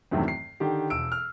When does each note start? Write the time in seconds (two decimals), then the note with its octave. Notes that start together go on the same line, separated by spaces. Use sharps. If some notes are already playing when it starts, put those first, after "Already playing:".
0.11 E2 G2 C3 D#3 F#3 A3
0.28 C7
0.60 D3 D#3 G4
0.90 E1 E6 D7
1.12 F6